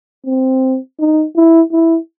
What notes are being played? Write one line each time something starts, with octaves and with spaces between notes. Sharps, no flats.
C4
D#4
E4
E4